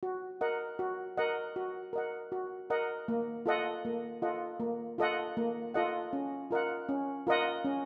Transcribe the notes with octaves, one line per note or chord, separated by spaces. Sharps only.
F#4
A#4 D#5 F#5
F#4
A#4 D#5 F#5
F#4
A#4 D#5 F#5
F#4
A#4 D#5 F#5
A#3
F4 A4 D#5 F#5
A#3
F4 A4 D#5 F#5
A#3
F4 A4 D#5 F#5
A#3
F4 A4 D#5 F#5
C#4
F4 A#4 D#5 F#5
C#4
F4 A#4 D#5 F#5
C#4